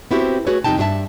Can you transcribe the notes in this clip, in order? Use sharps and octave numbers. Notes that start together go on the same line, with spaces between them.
B3 C4 E4 F#4 G4 C5
A3 F#4 G#4 B4 C#5
F2 C3 G3 D#4 G5 A5
G2 D4 F4 G#4 E5 A5